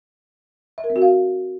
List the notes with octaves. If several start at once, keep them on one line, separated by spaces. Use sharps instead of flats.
E5
A#4
C4
F#4
F5